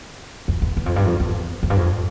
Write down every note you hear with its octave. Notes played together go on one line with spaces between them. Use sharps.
F2
E2
E2
F2
G2
F2
E2
F2
G2
F2